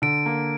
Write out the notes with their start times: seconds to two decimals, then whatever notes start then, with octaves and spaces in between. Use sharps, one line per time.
0.02 D3 D7
0.26 A#3